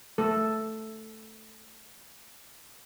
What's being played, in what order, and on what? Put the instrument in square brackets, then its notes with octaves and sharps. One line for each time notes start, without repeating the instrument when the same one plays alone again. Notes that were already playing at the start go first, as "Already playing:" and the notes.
[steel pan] A3 A4